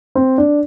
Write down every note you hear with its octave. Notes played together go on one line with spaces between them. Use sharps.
C4
D4